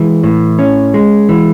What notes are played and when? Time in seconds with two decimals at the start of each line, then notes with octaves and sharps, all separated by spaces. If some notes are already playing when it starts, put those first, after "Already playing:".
Already playing: E3 G#3
0.23 A2
0.59 C#4
0.94 G#3
1.29 E3